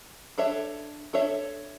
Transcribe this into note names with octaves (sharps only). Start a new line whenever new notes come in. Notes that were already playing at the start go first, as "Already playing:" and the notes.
D4 A4 C#5 E5
D4 A4 C#5 E5